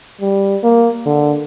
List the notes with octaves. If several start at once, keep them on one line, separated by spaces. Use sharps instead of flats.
G3
A#3
D3